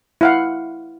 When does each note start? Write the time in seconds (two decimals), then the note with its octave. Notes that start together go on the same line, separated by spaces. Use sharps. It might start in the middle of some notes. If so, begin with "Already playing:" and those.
0.21 E4 F5 F#5